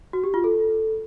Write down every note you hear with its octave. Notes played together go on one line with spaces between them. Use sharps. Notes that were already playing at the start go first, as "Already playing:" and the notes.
F#4
G4
F4
A4